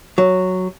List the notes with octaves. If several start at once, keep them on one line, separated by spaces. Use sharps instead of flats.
F#3